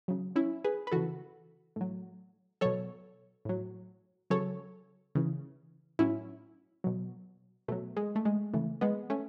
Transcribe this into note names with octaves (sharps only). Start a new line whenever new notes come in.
C#3 F#3
C#4 E4
G#4 B4
B4
C#3 E3 F#4 A4
A2 F#3
B2 F#3 A4 C#5
A2 F#3
C#3 F#3 A4 C#5
C#3 E3
A2 F#3 C#4 E4
B2 F#3
B2 F#3 A3
G#3
A3
G#3
C#3 E3 A3
G#3 B3
A3 C#4